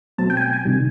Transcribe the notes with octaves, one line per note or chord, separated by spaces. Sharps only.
B2 F#3 A3 C4 A5
G5
G#5
G5
G#5
C3 D#3 G3